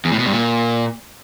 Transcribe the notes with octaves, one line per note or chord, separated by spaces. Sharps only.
E2
A2
B2
G2
A#2